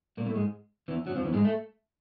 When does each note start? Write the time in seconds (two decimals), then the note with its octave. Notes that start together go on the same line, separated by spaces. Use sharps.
0.17 A#2 A#3
0.26 A2 A3
0.35 G#2 G#3
0.88 E2 E3
1.06 F#2 F#3
1.15 F2 F3
1.24 E2 E3
1.33 G#2 G#3
1.45 A3